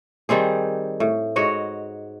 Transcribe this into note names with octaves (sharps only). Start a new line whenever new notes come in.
D#3 G3 C4 G#4
A2
G#2 F#4 C#5 D#5